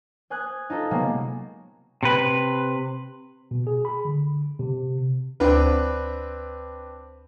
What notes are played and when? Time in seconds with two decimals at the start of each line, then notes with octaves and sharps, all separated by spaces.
0.30 C5 G#5 D#6 F#6 G#6
0.70 D#4 F4 A4 C5
0.91 C3 F#3 G#3 A#3 B3
2.03 C3 B4
3.51 B2
3.67 G#4
3.85 B5
4.05 D3
4.59 C3
5.40 D2 C4 D4 B4